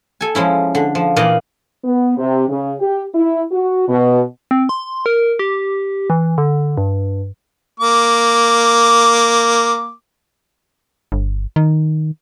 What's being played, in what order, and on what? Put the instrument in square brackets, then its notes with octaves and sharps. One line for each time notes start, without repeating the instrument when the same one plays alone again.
[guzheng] A4 G#5
F3 G#3 C#4 E4
D3
F3
A#2 E3 D5 D#5 F5
[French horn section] B3
C3
C#3
G4
E4
F#4
B2
[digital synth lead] C4
C6
A#4
G4
E3
D3
G2
[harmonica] A#3 D6
[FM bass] G1
D#3